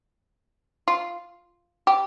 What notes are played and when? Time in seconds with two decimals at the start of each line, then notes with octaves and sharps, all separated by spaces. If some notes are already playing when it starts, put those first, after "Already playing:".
0.88 F4
1.87 G4